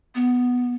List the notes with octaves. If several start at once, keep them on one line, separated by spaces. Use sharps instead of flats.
B3